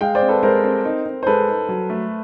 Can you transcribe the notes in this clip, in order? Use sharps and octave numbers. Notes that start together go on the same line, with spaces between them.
G#3 F5 G5
C5 D5
C4
A4 B4
G#3 A#4 C5
C4
D#4
C4
C5
G#3 A4 B4
D#4
F#3
A3